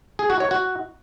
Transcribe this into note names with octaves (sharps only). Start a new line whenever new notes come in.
G#4
F#4
C#5
F#4